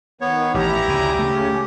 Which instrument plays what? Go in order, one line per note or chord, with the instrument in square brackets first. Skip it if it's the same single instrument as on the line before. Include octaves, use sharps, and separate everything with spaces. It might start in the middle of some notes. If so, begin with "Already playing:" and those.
[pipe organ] D#3 [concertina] B3 C#5
[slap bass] A1 [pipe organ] E4 A#5 [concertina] G4
[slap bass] D2 C#3
[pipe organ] C#3 C#4 [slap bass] A3